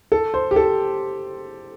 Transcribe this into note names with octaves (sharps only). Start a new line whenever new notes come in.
A4
C5
G4
A4